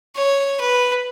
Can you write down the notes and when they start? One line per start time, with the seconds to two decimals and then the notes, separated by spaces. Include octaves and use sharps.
0.16 C#5
0.61 B4